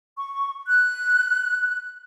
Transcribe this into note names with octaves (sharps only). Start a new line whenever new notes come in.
C#6
F#6